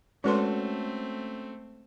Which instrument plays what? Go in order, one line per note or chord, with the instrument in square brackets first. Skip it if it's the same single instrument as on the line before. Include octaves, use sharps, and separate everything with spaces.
[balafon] G#3 B4 C6 [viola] A3 C4 [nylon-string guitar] C#4 F#4 A4